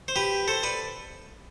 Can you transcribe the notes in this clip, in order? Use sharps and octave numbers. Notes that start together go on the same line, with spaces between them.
C5
G4 B4
A4 C5
B4 D5